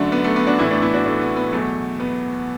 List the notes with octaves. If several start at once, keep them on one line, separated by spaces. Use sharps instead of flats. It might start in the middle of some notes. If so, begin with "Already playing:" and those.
Already playing: F#2 D3 F#3 A3 D4
B3
A3
B3
D4 F#4
A2 E3 B3 E4
A3 D4
B3 E4
D4 F#4
A3 D4
B3
B3
E2 B2 F#3 A3
B3